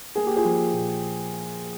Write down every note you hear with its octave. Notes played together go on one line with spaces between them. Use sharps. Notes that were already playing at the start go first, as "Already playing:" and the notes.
A#3 G#4
G4
F4 G#4
F3
A#2